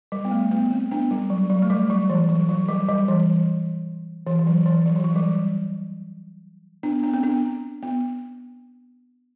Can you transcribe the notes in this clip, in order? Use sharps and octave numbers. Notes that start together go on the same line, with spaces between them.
G3
B3
A3
B3
C4
B3 D4
G3
F#3
F#3
A3
G3
F#3
E3
F#3
F#3
G3
G3
E3
E3
E3
F#3
E3
F#3
E3
F#3
G3
B3 D4
B3 D4
C4
B3 D4
B3